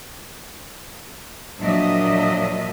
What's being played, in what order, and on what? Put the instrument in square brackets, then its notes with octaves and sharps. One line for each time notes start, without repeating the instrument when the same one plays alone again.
[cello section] A#2 F3 F#3 D4 D#5 E5